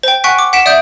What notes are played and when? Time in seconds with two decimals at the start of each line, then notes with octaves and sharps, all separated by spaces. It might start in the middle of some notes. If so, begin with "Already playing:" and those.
0.03 C5 G5
0.24 F#5 G#5 C#6 F#6 B6 D7
0.39 D6
0.53 F#5 B6 D7 E7
0.66 D5 E5 D#6 G6 D7